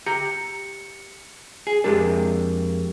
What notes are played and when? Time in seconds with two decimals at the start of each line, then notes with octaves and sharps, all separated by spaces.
0.06 G4 A#5 C#7
1.67 G#4
1.84 F2 G#3 D4 G4 G#4 A#4